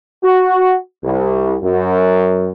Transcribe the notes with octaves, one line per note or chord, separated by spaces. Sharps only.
F#4
C2
F#2